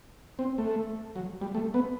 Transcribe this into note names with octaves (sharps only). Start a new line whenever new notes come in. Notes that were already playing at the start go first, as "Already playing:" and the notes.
C4
A3
F#3
G3
A3
B3